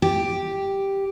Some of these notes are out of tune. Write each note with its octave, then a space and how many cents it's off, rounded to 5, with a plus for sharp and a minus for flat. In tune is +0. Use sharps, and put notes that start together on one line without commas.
G4 +0